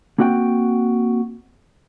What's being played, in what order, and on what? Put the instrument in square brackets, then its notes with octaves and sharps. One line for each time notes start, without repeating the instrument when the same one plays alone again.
[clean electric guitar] A#3 C4 F#4 F#5 G5